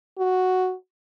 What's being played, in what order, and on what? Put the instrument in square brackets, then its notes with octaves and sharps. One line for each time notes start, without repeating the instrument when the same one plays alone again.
[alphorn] F#4